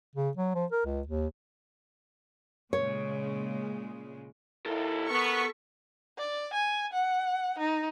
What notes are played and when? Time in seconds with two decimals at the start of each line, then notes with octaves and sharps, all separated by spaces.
0.16 C#3
0.37 F#3
0.55 F3
0.72 A#4
0.86 C#2
1.08 D#2
2.73 A#2 C#3 G#3 C#5
4.66 D#2 E4 A4 A#4
5.10 B3 C#6 B6
6.18 D5
6.53 G#5
6.93 F#5
7.58 D#4